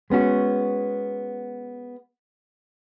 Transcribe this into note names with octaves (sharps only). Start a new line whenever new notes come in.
G#3 B3 C#4 F#4